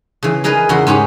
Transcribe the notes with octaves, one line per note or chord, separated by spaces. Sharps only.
C#3 E3
D#4 G#4 A#4 B4 D#5
E2 C#3 E4 F#4 C6
G#2 C#4 D#4 G4